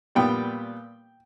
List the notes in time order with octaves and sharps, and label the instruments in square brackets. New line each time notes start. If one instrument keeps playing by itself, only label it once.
[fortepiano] A#2 G3 B3 G5